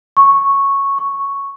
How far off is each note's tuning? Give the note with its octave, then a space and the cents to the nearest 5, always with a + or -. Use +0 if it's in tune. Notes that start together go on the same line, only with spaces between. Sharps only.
C#6 -5
C#6 +0